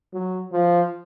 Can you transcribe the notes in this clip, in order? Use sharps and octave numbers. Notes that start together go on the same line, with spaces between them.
F#3
F3